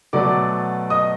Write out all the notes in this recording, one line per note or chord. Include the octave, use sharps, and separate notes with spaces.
B2 F#3 A3 D5 D6
D#5 D#6